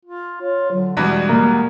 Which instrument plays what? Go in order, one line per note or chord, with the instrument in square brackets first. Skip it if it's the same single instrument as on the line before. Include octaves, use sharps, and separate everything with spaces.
[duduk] F4
[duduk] F4 [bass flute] C#5
[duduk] D3 [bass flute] F#3
[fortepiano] E2 B2 D4 [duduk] G3 [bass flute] G#3
[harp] A#3